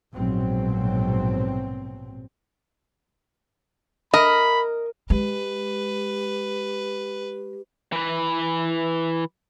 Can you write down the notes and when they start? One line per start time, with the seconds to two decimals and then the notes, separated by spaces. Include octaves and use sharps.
0.13 A#1 G#2 B2 F#3 C4
4.14 A#4 D#5 B5
5.10 G#3 G4 B4
7.93 E3 B4